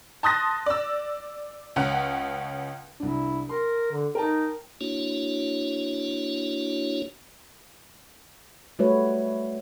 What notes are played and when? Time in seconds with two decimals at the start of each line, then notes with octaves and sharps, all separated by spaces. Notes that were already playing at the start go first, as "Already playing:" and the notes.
0.23 A5 C6 D#6 F#6 A6 A#6
0.66 D5 E6
1.76 C#2 C#4 F#5
3.00 C2 D4 E4
3.49 A#4 C6
3.92 D3
4.15 D#4 A#4 G5 A5
4.81 A#3 D4 E4 F#4 C#5
8.79 G3 A3 F#4 B4 C#5